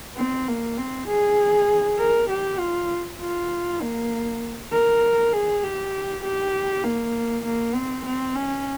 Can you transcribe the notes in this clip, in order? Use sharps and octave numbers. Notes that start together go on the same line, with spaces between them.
C4
A#3
C4
G#4
A#4
G4
F4
F4
A#3
A#4
G#4
G4
G4
A#3
A#3
C4
C4
C#4